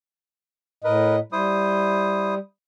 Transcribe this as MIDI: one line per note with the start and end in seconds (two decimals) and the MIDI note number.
0.84 1.19 45
0.84 1.16 70
0.84 1.16 71
0.84 1.19 75
1.32 2.39 55
1.32 2.35 64
1.32 2.35 72
1.32 2.35 87